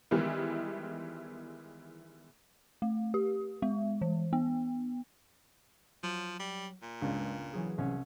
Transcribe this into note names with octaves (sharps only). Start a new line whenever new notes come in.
D#3 E3 G3 G#3 B3 E4
A3
G4
G#3
E3
B3
F3 F#3
G3
A#2
C#2 G2 G#3
E3 F#3 G#4
C2 C#4